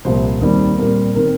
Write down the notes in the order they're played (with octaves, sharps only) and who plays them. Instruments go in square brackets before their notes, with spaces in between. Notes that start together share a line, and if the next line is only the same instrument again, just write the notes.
[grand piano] C2 A#2 F3 C5
D#2 D#3 G3 C4
A#2 G3 C4 A#4
D#3 C4 A#4